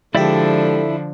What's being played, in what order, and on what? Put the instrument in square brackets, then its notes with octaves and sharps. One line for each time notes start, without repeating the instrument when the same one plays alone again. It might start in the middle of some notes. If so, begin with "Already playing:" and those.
[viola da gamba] D3 F3 [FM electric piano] G#3 G4 [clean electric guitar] E4 D5 E5 [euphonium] A4